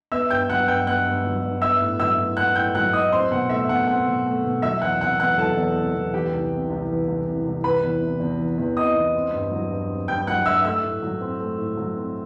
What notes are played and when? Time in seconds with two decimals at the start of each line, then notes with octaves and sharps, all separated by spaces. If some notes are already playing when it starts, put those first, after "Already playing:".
0.12 B3 E5 E6
0.30 G2 G5 G6
0.49 F#3 F#5 F#6
0.68 G2 G5 G6
0.87 B3 F#5 F#6
1.06 G2
1.25 F#3
1.43 G2
1.62 B3 E5 E6
1.81 A2
2.00 F#3 E5 E6
2.18 A2
2.37 B3 F#5 F#6
2.56 A2 G5 G6
2.75 F#3 F#5 F#6
2.93 A2 D#5 D#6
3.12 C4 C5 C6
3.32 B2 F#5
3.50 A3 E5
3.69 B2 F#5
3.87 C4 F#5
4.06 B2
4.25 A3
4.44 B2
4.62 F#3 E5 E6
4.82 E2 F#5 F#6
5.00 C3 F#5 F#6
5.19 E2 F#5 F#6
5.38 F#3 A4 A5
5.57 E2
5.76 C3
5.95 E2
6.13 E3 G4 G5
6.33 C2
6.51 C3
6.70 C2
6.89 E3
7.08 C2
7.26 C3
7.45 C2
7.64 E3 B4 B5
7.83 E2
8.01 C3
8.20 E2
8.39 E3
8.58 E2
8.77 C3 D#5 D#6
8.96 E2
9.15 C4
9.33 G2
9.51 F#3
9.71 G2
9.89 C4
10.08 G2 G5 G6
10.27 F#3 F#5 F#6
10.45 G2 E5 E6
10.64 A3 E5 E6
10.83 A2
11.03 F#3
11.21 C4
11.40 A3
11.59 A2
11.77 F#3
11.97 C4